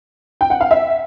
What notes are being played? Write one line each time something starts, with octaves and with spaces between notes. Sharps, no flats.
G5
F#5
F5
E5